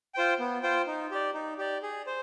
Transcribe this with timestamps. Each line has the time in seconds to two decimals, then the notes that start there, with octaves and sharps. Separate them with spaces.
0.14 F4 C5 G5
0.39 B3
0.63 F4 C5 G5
0.87 D#4
1.11 G4 D5
1.34 D#4
1.58 G4 D5
1.83 G#4
2.07 C5